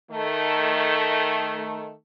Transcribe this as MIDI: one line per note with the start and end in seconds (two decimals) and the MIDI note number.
0.11 1.91 51
0.11 1.91 57